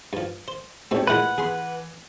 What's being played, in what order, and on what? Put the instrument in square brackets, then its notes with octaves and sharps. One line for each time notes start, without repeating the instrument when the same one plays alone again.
[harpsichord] G2 F3
C5
[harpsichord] G#2 B2 C4 [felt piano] A3 G4 C#5
[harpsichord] A#2 E3 G#3 [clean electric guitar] B4 F#5
[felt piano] E3 [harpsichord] G#4 B5 C6